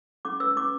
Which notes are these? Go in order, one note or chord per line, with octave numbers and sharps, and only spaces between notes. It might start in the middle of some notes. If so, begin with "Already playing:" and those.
C#4 D6
B4 E6
C#4 D6